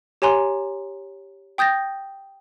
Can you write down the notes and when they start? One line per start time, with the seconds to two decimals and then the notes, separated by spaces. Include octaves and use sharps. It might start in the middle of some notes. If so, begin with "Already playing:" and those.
0.22 G4 C#5 G#5 A#5 C6
1.58 G5 D#6 G6 A6 A#6